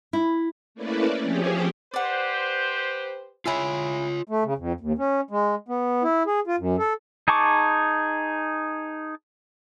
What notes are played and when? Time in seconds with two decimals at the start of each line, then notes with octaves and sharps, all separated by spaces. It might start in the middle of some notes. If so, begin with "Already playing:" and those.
0.13 E4
0.75 A3 A#3 C#4 E4 B4 D5
1.22 F3 C4 C#4 G4 G#4
1.94 G4 B4 C5 D5 F#5
3.46 E4 F4 G#4 C#5 E5
4.28 A3
4.44 C#3
4.58 F2
4.81 D#2
4.98 C#4
5.31 G#3
5.69 B3
6.03 E4
6.27 G#4
6.47 F4
6.59 F#2
6.79 A4
7.28 D#4 G#4 A5 C#6 D6